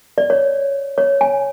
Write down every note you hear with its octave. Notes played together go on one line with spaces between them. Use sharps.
D5
C#5
C#5
G#5